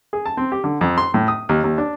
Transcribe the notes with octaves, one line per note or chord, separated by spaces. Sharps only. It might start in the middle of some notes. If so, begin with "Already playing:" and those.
G#4
A5
C4
G4
D3
F2
C6
A2
D#6
D#2
D#2
D4